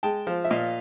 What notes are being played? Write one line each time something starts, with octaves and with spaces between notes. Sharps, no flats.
G#3 G5 A5
F3
E5
A#2 D#5 F5